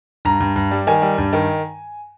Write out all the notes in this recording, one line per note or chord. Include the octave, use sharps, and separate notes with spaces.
G2 A#5
G2
G2
G3
D#3 G#5
G3
G2
D#3